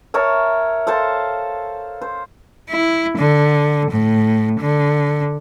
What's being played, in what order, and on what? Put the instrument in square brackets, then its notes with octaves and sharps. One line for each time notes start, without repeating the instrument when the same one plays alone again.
[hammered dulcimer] A#4 C#5 E5 A5
A4 C5 F5 A5
C5
[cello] E4
D3
A2
D3